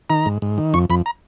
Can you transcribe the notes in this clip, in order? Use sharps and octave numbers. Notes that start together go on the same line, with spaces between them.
D#3 A#5
G#2
G#2
D#3
F2 C#6
F2 B5
A#5